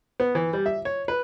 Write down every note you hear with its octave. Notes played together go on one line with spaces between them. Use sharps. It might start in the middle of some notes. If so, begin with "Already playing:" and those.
B3
E3
G3
E5
C#5
B4